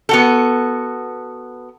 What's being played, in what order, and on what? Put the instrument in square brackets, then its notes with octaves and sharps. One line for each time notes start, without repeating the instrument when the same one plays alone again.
[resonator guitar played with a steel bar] B3 F#4 A4